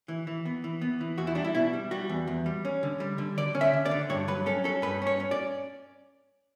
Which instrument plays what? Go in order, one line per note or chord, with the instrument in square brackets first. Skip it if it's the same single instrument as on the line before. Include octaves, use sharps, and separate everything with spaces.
[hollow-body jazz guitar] E3
E3
B3
E3
B3
E3
E2 F#4
E4
G3 D4
E4
B2 E4
G3
G3 F#4
E2
E2
G3
C#4
D3
G3
D3
D3 D5
C#4
E5
D3
D5
D3
G2 C#5
F#3 B4
C#4 A4
C#4 A4
G2 B4
C#4 C#5
C#4
D5